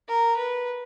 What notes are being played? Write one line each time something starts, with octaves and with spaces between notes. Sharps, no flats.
A#4
B4